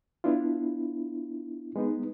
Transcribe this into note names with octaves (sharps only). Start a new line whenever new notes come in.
B3 D4 E4 F4
G#3 B3 D#4